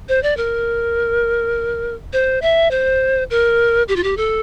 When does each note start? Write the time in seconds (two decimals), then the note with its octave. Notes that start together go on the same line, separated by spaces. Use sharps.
0.09 C5
0.23 D5
0.37 A#4
2.13 C5
2.42 E5
2.71 C5
3.30 A#4
3.88 G4
3.96 F4
4.04 G4
4.17 A4